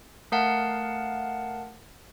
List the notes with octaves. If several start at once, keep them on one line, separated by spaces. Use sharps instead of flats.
A3 A#4 F5 F#5 A5